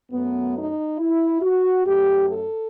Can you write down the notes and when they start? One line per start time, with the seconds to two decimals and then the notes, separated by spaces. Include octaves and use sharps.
0.11 F#2 F#3 A3 B3
0.54 D#4
0.98 E4
1.42 F#4
1.86 F#2 F#3 A3 G4
2.29 A4